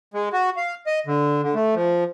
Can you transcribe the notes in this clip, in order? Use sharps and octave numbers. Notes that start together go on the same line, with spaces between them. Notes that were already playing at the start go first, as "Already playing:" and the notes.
G#3
F#4
F5
D#5
D3
D3
A3
F3